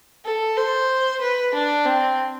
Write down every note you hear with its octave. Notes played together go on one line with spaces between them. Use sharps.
A4
C5
B4
D4
C4